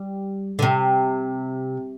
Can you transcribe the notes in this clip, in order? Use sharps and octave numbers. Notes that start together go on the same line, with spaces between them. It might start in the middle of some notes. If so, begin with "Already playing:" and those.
Already playing: G3
D3
C3